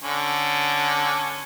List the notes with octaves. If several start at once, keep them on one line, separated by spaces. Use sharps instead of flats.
D3 C#4